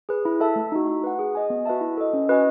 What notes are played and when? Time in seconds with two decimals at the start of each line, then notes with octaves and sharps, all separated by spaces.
0.09 G#4 B4
0.25 E4
0.40 A4 E5 A5
0.56 A3
0.72 D#4 F#4
0.88 F#4
1.04 B4 F#5
1.19 G#4
1.35 D#5 G#5
1.50 B3
1.66 F#4 B4 E5 A5
1.81 E4
1.97 A4 D#5
2.13 C#4
2.29 F#4 B4 D#5 G#5